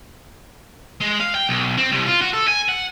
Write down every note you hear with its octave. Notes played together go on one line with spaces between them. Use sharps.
G#3
F5
G5
B1
C4
C2
F4
F#4
A4
G#5
F#5